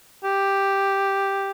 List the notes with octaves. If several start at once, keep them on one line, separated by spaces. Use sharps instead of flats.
G4